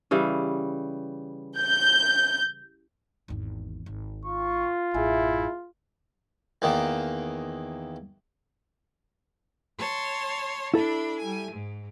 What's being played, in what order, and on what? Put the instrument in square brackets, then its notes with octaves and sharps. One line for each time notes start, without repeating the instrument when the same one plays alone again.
[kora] C#3 E3 G3
[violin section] G6
[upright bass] G#1 E2
G#1
[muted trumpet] F4 [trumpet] C#6
[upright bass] A1 F#2 [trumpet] E4 [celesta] G#4 E5 G#5
[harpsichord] E2 D#3 A#3
[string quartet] C#5 A5 C6
[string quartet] D4 B5 [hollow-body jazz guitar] E4 A4 E5
[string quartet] G3 G#5
G#2